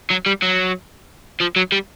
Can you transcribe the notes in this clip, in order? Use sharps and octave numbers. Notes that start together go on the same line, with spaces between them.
F#3
G3
F#3
F3
F#3
G3